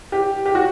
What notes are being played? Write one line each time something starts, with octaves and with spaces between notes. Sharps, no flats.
G4
G4
F#4